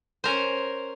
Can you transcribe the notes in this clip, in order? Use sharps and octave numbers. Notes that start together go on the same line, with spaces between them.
C#4 A#4 C5